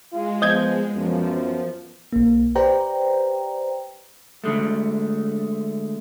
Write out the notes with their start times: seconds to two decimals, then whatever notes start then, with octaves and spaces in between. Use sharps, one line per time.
0.13 G#3 F4
0.42 F3 B3 D#5 G6 G#6
0.95 F#2 F3 B3
2.13 B1 A#3
2.55 G4 B4 C5 D5 G5 A#5
4.44 D3 G#3 A3